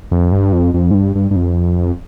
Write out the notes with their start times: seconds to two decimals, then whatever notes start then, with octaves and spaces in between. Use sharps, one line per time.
0.11 F2
0.32 G2
0.53 F2
0.74 F2
0.91 G#2
0.94 G2
1.16 G2
1.31 G2
1.36 F2